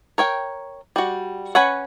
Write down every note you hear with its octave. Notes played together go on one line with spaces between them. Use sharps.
A#4 C#5 G5
G3 F#4
C#4 B4 C#5 F#5